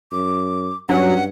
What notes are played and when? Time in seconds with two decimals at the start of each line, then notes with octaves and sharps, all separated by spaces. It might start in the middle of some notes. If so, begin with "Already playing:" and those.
0.12 F#2 D6
0.89 G2 F#3 C#4 F#5